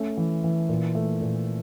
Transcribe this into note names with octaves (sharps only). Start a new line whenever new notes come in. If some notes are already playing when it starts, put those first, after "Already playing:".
Already playing: A3 C#4
E3
E3
A#2
A3
A#2